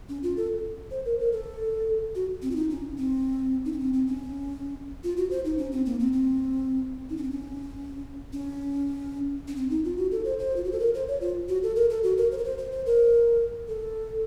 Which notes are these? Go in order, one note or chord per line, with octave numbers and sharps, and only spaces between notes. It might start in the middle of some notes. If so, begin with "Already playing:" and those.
C#4
F4
A4
C5
A#4
A#4
A4
F#4
C4
F4
D#4
C#4
C4
D#4
C#4
C4
C4
C#4
F4
F#4
C5
D#4
C#4
C4
A#3
C4
C4
D#4
C#4
C4
C#4
C#4
C#4
C4
D#4
F4
F#4
A4
C5
C5
F4
F#4
A4
A#4
C5
C#5
F4
F#4
A4
A#4
A4
F#4
A#4
C5
A#4
C5
C5
C5
A#4
A4